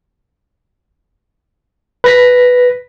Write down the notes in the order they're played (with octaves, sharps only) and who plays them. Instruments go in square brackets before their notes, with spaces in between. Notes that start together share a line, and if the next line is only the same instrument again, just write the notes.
[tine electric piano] B4 A#6 B6